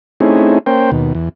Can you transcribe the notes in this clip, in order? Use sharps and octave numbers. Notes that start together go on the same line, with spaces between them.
A3 C4 C#4 D#4 E4 G#4
A#3 C#4 C5 G5
D#2 B2
E2